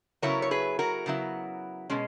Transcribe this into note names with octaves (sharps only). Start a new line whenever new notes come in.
C#3 F#3 B3 E4 A#4 C#5
C#5
G#4 B4
F#4 A#4
C#3 F#3 B3 E4
B2 G#3 C#4